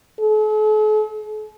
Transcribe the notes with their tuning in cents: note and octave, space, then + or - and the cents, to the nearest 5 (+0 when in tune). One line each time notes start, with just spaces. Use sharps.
A4 -45